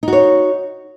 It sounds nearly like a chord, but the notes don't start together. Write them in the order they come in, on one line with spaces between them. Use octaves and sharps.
D#4 F#4 C#5